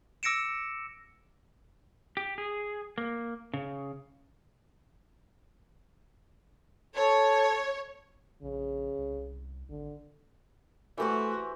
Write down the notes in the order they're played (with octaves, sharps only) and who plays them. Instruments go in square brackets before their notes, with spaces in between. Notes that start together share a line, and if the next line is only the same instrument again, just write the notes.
[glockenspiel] D6 E6 A#6 C#7 D7 E7
[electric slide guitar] G4
G#4
A#3
C#3
[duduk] A4 [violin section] C#5
[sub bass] A#1 [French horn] C#3
[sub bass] C2
[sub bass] G#1 [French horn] D3
[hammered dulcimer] E3 G4 C5 [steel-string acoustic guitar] A3 A4 E5 [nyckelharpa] F#4